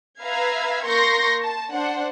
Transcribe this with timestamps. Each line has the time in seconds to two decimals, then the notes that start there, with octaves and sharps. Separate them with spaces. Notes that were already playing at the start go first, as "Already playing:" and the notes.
0.21 B4 E5 F5 A#5 G#6
0.85 A#3 A#4 C6 C#6 G6 A#6
1.42 A5
1.73 D4 C5 F#5